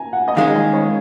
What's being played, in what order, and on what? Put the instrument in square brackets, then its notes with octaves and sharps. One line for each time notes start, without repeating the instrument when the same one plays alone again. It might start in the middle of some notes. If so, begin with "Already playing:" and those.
Already playing: [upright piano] G#5 A#5
F#5
D#5
[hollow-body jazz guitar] D#3 G#3 C#4 [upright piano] F5
[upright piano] D#5
C#5